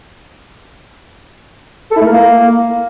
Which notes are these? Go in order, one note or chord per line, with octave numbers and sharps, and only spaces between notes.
A4
E4
A3
A#4
A#3